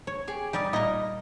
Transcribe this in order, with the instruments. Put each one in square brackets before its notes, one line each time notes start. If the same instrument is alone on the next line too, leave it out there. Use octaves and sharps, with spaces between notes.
[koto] C#5
[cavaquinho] G4 G#4
[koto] G3 G4 [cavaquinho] D#4 D5 D#6
[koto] A#2 A#4 [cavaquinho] D#4 E4 D#5